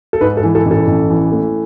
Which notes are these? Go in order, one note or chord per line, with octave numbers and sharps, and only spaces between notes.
A4
G#2 B4
A4
E3
A4
A1
A4
A1
E3
A3